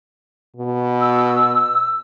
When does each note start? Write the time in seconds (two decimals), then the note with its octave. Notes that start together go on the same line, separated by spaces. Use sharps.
0.56 B2
1.00 E6